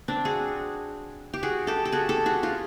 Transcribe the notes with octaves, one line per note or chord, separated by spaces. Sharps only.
C4 D4
F#4 G#4
G4
F#4 G#4
G4 A4
A4
F#4 G#4
G4 A4
F#4 G#4
F4 G4